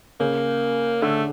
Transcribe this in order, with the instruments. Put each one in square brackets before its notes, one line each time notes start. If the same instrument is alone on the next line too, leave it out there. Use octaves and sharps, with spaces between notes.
[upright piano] C#3 [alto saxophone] A#3
[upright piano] D3 [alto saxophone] A3